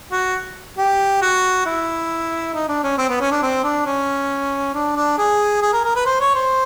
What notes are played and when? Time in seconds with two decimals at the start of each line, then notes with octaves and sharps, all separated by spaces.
0.12 F#4
0.78 G4
1.22 F#4
1.66 E4
2.54 D#4
2.69 D4
2.84 C#4
2.98 C4
3.09 B3
3.21 C#4
3.31 D4
3.42 C4
3.64 D4
3.86 C#4
4.74 D4
4.96 D4
5.18 G#4
5.62 G#4
5.73 A#4
5.84 A#4
5.96 B4
6.06 C5
6.21 C#5
6.35 C5